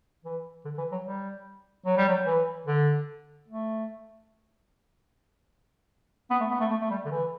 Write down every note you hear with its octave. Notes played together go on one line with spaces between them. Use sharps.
E3
D3
E3
F#3
G3
F#3
G3
F#3
E3
D3
A3
B3
A3
B3
A3
A3
A3
G3
D3
E3